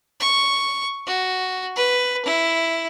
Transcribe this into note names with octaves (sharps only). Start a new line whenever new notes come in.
C#6
F#4
B4
E4